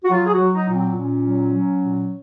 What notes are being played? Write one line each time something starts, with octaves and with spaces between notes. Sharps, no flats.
F#4
F#3 F4
G#4
F#4
F#3
D#4
A#2
C4
A#2 C#4
F#3
F#3
A#2